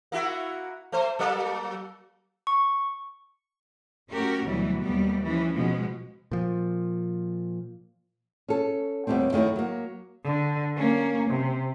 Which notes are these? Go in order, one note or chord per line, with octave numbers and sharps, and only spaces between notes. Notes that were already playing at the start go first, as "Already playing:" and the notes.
A#3 E4 F#4
A3 C5
F#3 A#3 A4
C#6
A3 C#4 F#4 G4 A#4
D2 B2 E3 F#3 G3
D#2 G3 A3 B3
E3 F3 C#4
B2 F3 G#3
A#2 F3
C#4 A4
D#2 G3 A3 B3 C4
F#2 D#3 A3 E4
F#3 A#3
D3
A#3 C#4
C3